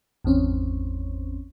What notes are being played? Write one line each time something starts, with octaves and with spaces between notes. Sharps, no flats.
G#1 E2 C4 C#4